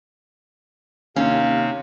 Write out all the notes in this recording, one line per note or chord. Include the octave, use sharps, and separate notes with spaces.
D#2 C3 C4 C#4 F5